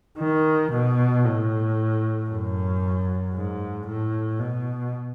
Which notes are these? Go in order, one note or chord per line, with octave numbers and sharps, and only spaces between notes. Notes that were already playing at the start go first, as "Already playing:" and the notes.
D#3
B2
A2
F#2
G#2
A2
B2